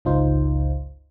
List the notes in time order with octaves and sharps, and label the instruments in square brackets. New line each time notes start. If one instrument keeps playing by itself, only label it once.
[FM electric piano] G1 C#2 D#4 F4 C5